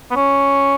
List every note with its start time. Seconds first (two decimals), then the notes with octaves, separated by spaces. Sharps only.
0.11 B3
0.16 C#4